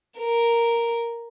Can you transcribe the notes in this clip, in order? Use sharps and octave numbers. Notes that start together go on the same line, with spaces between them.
A#4